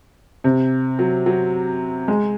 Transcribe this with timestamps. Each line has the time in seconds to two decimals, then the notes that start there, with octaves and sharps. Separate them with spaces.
0.44 C3
0.99 F#3
1.26 F#3
2.08 G#3